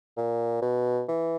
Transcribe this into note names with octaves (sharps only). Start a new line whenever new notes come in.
A#2
B2
E3